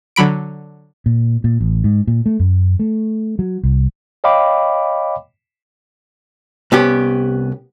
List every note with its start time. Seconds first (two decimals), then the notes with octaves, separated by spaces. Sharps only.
0.16 D3 F#3 B5 D7
1.06 A#2
1.44 A#2
1.61 A1
1.84 G#2
2.07 A#2
2.26 A3
2.40 F#2
2.80 A3
3.39 F#3
3.63 C2
4.24 C#5 D#5 F5 G5 B5 D6
6.72 C2 B3 C#4 G4